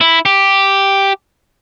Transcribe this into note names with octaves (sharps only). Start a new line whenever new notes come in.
E4
G4